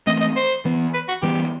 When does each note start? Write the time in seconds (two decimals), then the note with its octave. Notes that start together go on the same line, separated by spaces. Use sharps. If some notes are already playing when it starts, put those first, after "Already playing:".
0.07 E3 A3 C4 D#5
0.21 D#5
0.36 C5
0.65 E3 B3
0.94 B4
1.08 F#4
1.22 E3 G3 B3 G4